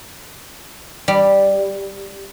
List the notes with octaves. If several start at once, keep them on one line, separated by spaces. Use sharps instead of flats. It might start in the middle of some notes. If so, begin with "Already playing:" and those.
G3